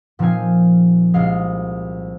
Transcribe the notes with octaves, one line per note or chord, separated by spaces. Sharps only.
A#2 F3 C4 D#4 F5 G#5
C2 A#2 G#3 F5